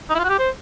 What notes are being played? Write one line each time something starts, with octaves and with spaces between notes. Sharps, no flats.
D#4
E4
F4
F#4
G4
C5